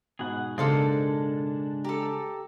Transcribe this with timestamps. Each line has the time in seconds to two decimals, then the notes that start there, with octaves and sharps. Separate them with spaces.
0.19 G#2 B2 G#4 F#5
0.58 C#3 G#3 A#3 D4 A4 C5
1.84 G4 A4 A#5